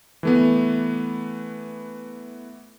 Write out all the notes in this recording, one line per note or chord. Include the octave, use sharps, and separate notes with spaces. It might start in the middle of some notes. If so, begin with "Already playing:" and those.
E3 A3 B3